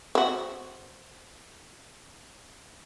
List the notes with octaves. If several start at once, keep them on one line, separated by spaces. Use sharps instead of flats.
C4 F#4